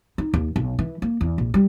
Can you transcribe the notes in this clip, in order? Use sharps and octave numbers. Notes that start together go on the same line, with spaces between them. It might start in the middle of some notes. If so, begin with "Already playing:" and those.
D#4
D#2
B1
E3
A#3
E2
A#1
G3